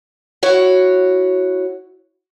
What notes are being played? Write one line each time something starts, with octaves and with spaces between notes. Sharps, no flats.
E4 F#4 C#5